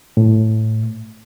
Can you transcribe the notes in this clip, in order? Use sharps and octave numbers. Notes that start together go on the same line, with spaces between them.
A2